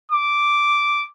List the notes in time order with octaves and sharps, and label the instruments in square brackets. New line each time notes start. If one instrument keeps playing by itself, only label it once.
[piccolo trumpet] D6